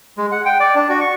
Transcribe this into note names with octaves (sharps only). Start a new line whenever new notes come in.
G#3
F#5
G5
D5
D4
F#4
C#6